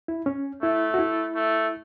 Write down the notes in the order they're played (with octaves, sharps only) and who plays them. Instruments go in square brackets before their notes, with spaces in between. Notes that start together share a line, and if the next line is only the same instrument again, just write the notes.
[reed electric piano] E4
C#4
[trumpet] A3 [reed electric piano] E4
[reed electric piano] F#4
E4
[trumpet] A3